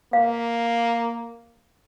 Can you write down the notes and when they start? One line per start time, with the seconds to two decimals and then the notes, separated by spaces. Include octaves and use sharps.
0.13 A#3 F5